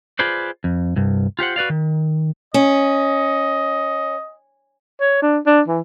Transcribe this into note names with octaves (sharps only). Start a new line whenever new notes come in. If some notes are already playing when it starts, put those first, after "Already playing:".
F4 G#4 B4 C5 D5
F2
C2 G2
F4 G4 C5 F#5
F#4 B4 D5 F5
D#3
C#4 D#5
C#5
D4
D4
E3